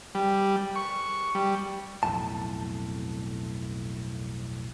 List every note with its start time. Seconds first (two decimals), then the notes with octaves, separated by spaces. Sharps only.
0.15 G3
0.76 C#6
1.35 G3
2.03 B1 F2 A2 A5